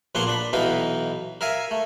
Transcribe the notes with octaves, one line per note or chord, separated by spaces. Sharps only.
A#1 F3 A#3 B3 F#5 C6
D4 B5
B1 B2 E3 D#4 B4 F5
A#4 E5 F5 G#5
A3